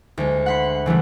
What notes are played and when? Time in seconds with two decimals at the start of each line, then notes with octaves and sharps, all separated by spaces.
0.17 D2 G#3
0.46 F#5 B5 C6
0.86 C#3 E3 G3 A3